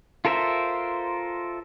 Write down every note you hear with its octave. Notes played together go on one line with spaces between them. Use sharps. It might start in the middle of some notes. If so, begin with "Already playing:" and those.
F4 A4 A#4 C5 E5